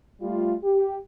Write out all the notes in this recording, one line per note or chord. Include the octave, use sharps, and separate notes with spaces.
G3 A3 F4
G4